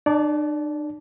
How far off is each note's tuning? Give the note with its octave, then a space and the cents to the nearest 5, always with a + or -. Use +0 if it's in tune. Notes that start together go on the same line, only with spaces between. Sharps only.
D4 +45 D5 -20 A5 -25